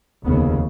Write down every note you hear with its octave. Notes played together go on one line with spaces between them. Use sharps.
F1 D#2 C#3 B3